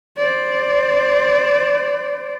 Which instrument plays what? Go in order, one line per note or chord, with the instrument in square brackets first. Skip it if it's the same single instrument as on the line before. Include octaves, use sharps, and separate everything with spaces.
[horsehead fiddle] C5 D5